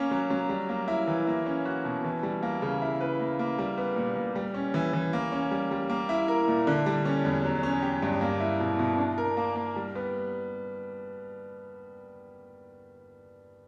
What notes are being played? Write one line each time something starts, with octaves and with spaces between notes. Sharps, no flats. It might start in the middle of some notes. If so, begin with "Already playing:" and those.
Already playing: A#3 C#4
F#3
F#3
G3
A#3
E4
E3
A#3
C#4
F#4
B2
E3
G3
A#3
C#3
E4
B4
A#3
A#3
G3
B3
A#2
A#2
G3
C#4
E3
E3
A#3
C#4
G3
G3
A#3
E4
A#4
A#2
D3
G3
C#4
E2
F#3
C#4
G4
G2
A#3
E4
B2
B2
D4
A#4
A#3
A#3
G3
B3